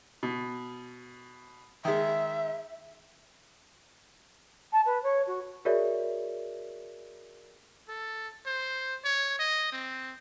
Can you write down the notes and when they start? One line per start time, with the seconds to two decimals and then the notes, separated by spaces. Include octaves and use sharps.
0.23 B2
1.85 D#3 G#3 E5
4.72 A5
4.86 B4
5.03 C#5
5.27 F#4
5.65 F#4 G#4 A#4 C#5 D5 E5
7.89 A4
8.46 C5
9.05 C#5
9.39 D#5
9.72 C4